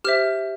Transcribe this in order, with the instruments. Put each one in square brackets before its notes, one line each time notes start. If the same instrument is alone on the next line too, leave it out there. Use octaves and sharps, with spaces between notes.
[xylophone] G4 C5 E5 F6